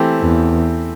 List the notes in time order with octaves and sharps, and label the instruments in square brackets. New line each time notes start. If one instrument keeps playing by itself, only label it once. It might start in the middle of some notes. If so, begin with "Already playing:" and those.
Already playing: [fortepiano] E3 A3 C4 G4
[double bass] E2